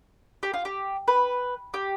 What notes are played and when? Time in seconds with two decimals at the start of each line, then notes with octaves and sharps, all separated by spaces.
0.43 G4
0.54 F4
0.65 G4
1.08 B4
1.74 G4